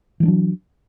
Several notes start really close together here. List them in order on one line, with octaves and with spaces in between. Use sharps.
E3 G#3 D4 F#3